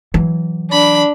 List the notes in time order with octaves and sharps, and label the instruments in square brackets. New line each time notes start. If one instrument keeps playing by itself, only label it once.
[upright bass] E3 F#3
[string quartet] D4 [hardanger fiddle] B5